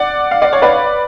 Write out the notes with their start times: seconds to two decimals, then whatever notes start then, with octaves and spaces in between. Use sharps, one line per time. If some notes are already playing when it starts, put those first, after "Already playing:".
Already playing: D5 F#5
0.31 F5
0.42 D5
0.53 C#5
0.62 B4 D5